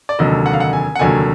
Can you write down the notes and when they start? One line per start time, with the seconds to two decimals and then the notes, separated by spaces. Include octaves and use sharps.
0.09 D5
0.19 F1 D#2 D3 F#3 D#5
0.46 F#5
0.53 F5
0.60 F#5
0.73 G#5
0.95 F#5
0.99 F1 D#2 D3 F#3 G#5